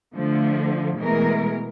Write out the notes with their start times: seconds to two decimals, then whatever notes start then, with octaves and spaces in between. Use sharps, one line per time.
0.15 D3 F3 A3
0.98 B2 E3 G#3 A3 A#4